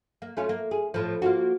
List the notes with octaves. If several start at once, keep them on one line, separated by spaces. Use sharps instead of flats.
A#3
A3 C#4 F4
A#3
G#4
A2 F3
A#3 F4 F#4